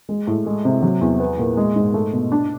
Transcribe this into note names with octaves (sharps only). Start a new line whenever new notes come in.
G#3
A2
G#3
C3
F#3
E2
B3
A#2
G#3
G#2
A3
B2
D4